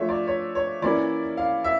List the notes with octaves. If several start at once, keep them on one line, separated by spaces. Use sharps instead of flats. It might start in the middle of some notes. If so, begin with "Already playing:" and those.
Already playing: F3 A3 D4 F4 C#5 E5
D5
C#5
C#5
E3 A#3 C#4 E4 D5
F5
E5